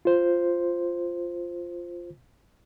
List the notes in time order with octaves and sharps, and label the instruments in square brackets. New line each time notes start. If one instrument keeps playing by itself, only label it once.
[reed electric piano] F4 C5